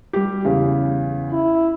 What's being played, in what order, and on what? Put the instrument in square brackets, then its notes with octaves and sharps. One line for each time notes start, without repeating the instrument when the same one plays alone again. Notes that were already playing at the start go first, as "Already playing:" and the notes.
[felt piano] G3 G4
E2 C#3
[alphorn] E4